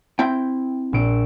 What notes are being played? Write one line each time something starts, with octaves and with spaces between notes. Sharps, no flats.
C4 E4 G5
A#1 E6 D7